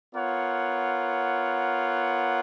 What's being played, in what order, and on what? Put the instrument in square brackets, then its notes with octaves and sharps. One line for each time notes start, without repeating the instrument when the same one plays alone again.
[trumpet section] B3 F4 A#4 C#5 F#5